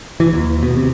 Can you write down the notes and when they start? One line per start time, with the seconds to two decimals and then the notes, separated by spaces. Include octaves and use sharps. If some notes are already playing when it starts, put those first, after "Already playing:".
0.20 E3
0.33 D#2
0.63 B2
0.76 C3